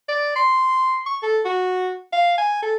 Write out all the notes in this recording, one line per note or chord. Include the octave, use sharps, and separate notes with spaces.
D5
C6
C#6
A4
F#4
F5
G#5
A4